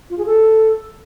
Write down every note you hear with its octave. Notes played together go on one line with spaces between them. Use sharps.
F4
G#4
A4